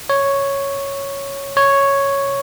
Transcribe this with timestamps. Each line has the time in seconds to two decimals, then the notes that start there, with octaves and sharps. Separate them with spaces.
0.10 C#5
1.57 C#5